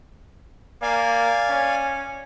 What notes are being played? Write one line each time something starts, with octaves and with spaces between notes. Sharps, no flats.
A#3 D5 F5 G#5
C#4